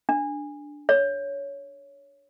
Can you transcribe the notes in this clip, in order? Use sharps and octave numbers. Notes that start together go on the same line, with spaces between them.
D4
C#5